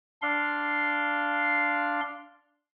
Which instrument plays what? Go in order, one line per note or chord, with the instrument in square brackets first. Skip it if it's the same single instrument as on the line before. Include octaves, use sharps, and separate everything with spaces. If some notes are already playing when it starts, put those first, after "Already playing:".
[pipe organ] D4 F5 C6